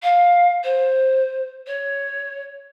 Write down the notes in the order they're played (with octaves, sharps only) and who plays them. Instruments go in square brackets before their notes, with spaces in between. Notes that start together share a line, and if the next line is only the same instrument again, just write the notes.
[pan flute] F5
C5
C#5